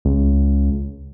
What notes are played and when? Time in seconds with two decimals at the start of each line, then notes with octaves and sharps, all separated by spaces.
0.05 C#2